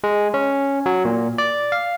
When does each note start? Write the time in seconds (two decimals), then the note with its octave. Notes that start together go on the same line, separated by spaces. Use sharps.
0.04 G#3
0.34 C#4
0.86 F#3
1.05 A#2
1.38 D5
1.72 F5